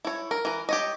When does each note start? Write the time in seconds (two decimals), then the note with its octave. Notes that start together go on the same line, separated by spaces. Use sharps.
0.05 E4 C#5
0.31 A#4
0.45 E3 A#4
0.69 G4 C#5 D#5